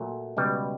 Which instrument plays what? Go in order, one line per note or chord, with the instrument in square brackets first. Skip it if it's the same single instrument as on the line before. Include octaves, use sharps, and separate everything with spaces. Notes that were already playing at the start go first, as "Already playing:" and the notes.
Already playing: [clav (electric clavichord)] A#2 F#3 A3
C#2 B2 G3